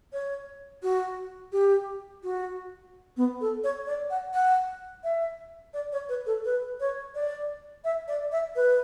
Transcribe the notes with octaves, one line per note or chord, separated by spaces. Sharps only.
C#5
F#4
G4
F#4
B3
A4
C#5
D5
F#5
F#5
E5
D5
C#5
B4
A4
B4
C#5
D5
E5
D5
E5
B4